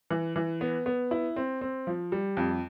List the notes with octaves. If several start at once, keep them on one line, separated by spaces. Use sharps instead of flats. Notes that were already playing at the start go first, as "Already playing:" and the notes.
E3
E3
B3
B3
E4
C4
C4
F3
G3
F2